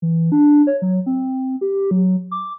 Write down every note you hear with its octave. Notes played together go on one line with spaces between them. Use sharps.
E3
D4
C#5
F#3
C4
G4
F#3
D6